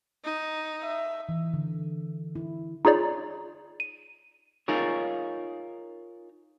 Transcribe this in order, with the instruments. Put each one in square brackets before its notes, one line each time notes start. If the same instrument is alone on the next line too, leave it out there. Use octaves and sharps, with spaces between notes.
[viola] D#4
[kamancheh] E5
[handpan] E3
D3
E4
[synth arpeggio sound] D#4 F4 G#4 C#5 D5
D#7
[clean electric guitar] D#4 F4 G#4 A#4 C#5